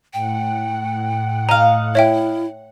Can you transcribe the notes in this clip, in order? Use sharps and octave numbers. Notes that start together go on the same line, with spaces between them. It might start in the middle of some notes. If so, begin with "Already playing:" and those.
A2 F#5 G5
D#5 F5 A#5
E4 C#5 E5 G5